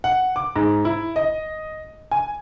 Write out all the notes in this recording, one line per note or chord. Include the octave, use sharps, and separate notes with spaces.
F#5
D6
G#2
E4
D#5
G#5